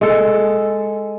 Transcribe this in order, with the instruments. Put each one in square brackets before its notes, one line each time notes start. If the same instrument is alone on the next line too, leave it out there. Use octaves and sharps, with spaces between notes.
[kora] G#3 A4